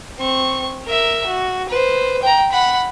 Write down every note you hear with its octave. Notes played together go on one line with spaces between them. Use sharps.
C4 C#6
A#4 E5
F#4
B4 C5
G5 A#5
F#5 B5